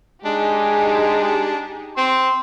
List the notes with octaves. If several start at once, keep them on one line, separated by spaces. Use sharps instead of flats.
G#3 D4 D#4 G4 G#4
C4 C6